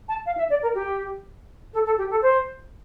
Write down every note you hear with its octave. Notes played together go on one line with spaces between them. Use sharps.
A5
F5
E5
D5
A#4
G4
A4
A4
G4
A4
C5